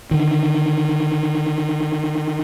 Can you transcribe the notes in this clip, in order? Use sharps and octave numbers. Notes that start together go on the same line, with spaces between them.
D3 D#3